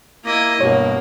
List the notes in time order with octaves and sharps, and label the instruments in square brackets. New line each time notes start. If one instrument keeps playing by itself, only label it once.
[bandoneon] A#3 [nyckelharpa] E4 D#5
[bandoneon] G2 B2 [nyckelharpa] A#3 [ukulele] C#5